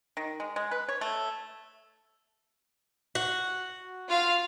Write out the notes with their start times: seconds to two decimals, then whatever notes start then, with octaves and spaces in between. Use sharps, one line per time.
0.17 D#3
0.40 G#3
0.56 G#3
0.71 B4
0.88 C#5
1.01 A3
3.15 F#4
4.09 F4 F5